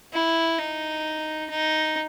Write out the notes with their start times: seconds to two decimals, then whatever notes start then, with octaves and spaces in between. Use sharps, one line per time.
0.13 E4
0.59 D#4
1.50 D#4